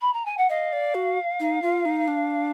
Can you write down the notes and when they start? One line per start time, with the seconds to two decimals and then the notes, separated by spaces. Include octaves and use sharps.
0.01 B5
0.13 A#5
0.25 G#5
0.37 F#5
0.49 D#5 F5
0.73 D5
0.95 F#4
1.40 D#4
1.62 F4
1.85 D#4
2.08 D4